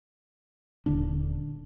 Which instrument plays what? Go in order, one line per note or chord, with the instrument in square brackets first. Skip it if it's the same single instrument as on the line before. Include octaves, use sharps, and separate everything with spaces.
[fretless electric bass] D#1 D3 D4